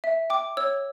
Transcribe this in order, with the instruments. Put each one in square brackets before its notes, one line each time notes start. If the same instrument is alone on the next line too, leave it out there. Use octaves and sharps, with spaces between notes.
[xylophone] E5
G5 D6
C#5 E6